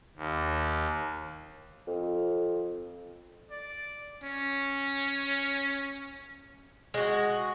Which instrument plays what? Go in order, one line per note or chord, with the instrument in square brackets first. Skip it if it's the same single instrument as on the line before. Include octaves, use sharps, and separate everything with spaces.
[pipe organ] D#2
[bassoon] F2
[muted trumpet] D5
C#4
[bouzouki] G#3 F#4